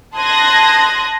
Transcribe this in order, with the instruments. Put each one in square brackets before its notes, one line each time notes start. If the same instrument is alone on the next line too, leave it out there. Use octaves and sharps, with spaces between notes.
[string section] A5 C6 D#6 F#6 G#6 A#6